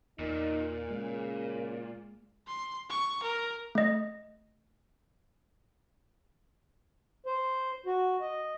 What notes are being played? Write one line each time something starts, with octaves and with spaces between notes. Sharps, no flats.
E2 A#2 D#4 A#4
C#3 G#3
C6
C#6
A#4
A3 D#5
C5
F#4
D#5